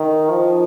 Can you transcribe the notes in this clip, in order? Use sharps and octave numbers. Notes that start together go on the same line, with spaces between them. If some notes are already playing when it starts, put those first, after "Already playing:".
Already playing: D#3
F3